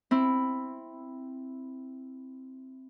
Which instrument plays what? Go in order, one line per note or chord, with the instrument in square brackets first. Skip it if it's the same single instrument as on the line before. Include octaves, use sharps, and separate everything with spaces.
[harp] C4 E4